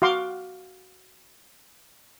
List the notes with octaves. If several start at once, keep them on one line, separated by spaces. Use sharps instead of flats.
F#4 F5 C6 D6